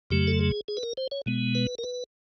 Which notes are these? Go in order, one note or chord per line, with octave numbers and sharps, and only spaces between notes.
F2 C#3 F#3 A3 G4
A4
G#4
G#4
B4
A#4
C5
C#5
B2 G#3 B3
B4
A#4
B4